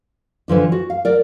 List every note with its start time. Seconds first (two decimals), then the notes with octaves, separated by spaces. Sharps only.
0.48 D3 E3 F3 D4
0.72 F#4
0.90 F5
1.05 A#4 D5